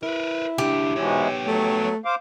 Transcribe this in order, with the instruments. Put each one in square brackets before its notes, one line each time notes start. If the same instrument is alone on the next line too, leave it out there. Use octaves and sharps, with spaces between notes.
[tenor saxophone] E4 [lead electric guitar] A#4 B4
[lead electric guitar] C#2 D4 [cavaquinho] G4
[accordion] G#2 B2 E3 [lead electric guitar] B3 C#5
[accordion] F#3 [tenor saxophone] A3
[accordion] C5 F5 D6